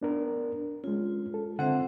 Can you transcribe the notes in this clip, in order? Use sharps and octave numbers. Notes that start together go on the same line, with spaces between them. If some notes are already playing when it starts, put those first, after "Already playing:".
B3 D4 A#4
G#3 C#4 F4
A4
D3 C4 C5 E5 F#5